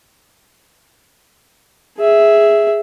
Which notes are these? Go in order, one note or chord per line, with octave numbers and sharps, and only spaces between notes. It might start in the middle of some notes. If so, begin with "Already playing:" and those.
G#4 E5